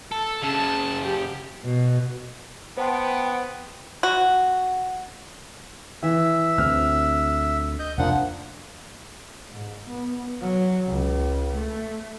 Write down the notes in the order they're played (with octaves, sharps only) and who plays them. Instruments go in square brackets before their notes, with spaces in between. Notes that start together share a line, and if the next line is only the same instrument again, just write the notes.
[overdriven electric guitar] A4
[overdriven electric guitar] F#2 C#3 [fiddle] A5
[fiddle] G4
[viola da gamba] B2
[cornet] B3 [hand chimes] C5 A5 C6 [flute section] F#5 G5
[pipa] F#4
[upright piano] E3 [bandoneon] E5
[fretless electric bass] D2 C4 [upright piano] F6
[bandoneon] D#5 G6
[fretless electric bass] F1 D4 [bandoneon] F3 A#3 F#5
[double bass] G#2
B3
F#3
C#2
A3